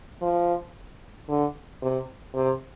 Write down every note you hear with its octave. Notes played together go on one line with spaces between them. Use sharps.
F3
D3
C3
C3